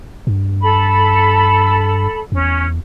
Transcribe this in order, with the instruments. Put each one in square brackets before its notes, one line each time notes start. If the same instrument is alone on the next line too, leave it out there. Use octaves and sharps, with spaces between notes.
[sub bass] G2
[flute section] A4 B5
[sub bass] E2 [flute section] C#4